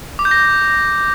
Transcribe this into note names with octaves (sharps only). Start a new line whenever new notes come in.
D6
G6
A#6